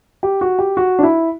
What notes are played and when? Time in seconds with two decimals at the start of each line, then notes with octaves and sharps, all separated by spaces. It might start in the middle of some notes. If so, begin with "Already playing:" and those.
0.23 G4
0.41 F#4
0.59 G4
0.77 F#4
0.99 D4
1.03 E4